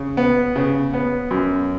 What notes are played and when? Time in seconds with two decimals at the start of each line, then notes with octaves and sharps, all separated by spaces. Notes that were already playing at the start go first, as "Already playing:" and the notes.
Already playing: C#3
0.17 B3
0.56 C#3
0.94 B3
1.31 F#2